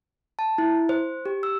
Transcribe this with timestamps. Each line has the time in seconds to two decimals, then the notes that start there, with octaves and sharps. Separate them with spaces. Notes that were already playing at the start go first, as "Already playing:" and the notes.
0.39 A5
0.58 E4
0.89 C5
1.26 G4
1.43 E6